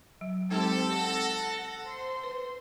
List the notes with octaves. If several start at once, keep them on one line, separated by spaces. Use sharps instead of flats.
F#3
F#3 G#3 C4 D#4 G4 A4
F#5 A#6
C5 C6
B4